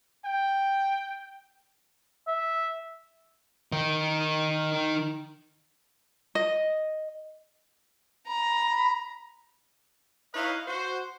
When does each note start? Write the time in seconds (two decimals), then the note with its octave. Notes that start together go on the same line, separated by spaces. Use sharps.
0.24 G5
2.28 E5
3.72 D#3 D#4
6.35 D#5
8.27 A#5 B5
10.34 D#4 E4 B4 C#5 D#5 F5
10.68 F#4 C5